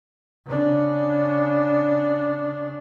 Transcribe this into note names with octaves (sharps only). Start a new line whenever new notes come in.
C#3 D4